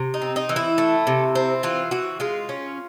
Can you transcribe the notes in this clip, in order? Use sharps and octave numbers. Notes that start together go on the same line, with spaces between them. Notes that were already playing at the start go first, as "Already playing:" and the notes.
Already playing: C3
D#4
C4
D#4
E3
E4
A3
C3
C4
E3 F4
E3 F#4
G#3 F4
C#4